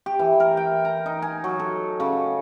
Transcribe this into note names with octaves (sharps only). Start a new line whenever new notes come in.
G4
E3
A#4
G5
A#5
D#4
G#5
F#3
A4
C#3